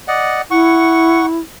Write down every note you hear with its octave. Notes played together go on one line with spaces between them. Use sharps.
D5 D#5 F#5
E4 F#5 C#6